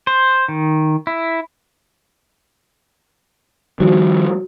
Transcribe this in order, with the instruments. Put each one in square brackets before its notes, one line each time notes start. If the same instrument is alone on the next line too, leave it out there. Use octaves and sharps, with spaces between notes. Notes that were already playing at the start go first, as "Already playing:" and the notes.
[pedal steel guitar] C5
D#3
E4
[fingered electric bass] D#3 F3 G3 [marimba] F#4